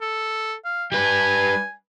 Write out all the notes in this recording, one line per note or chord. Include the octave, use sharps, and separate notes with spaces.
A4
F5
G3 B4 G#5